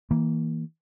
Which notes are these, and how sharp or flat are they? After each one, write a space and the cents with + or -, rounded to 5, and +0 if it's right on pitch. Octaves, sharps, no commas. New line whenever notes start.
E3 -30 A#3 +0